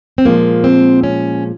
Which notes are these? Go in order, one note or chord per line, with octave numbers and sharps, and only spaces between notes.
C4
A#2 F3 G#3 A#3
C4
C#4